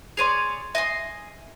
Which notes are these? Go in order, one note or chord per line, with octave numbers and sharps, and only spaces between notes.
G#4 C#5 D5 C6 D#7 F7
D#5 E5 G#5 C6